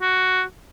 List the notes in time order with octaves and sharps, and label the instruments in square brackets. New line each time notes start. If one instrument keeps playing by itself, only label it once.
[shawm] F#4